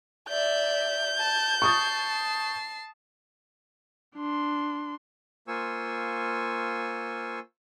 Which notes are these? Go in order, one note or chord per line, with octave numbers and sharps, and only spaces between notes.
D5 E5 G6
A5
A5 C#6 D#6 A6 C7
D4 C6
A#3 F4 C5 G#5 C#6 E6